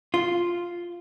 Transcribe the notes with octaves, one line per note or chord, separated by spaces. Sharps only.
F4